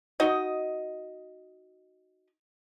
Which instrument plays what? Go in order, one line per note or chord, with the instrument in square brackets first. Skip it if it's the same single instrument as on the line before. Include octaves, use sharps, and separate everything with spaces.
[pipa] D#4 F#4 D#5